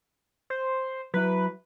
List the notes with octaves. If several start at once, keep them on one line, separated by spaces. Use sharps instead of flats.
C5
F#3 E4 B4